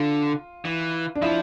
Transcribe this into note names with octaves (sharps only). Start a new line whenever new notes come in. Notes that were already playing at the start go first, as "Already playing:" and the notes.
Already playing: D3 F4
E3
D4
F3 E4